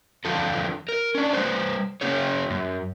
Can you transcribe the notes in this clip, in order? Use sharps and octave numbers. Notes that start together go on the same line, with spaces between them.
E2 D3 F3 F4 A4
A#4
C#4 D4
G3 A#3 B4 C5
C#3 A#3 C#4 G#4 C#5
F#2